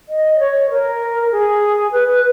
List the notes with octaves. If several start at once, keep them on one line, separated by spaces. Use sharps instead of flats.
D#5
C#5
A#4
G#4
B4